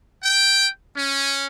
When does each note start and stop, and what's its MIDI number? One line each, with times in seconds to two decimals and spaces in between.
0.23 0.67 79
0.95 1.46 61